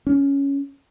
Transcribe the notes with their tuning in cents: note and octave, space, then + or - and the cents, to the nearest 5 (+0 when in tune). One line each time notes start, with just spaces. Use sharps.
C#4 +5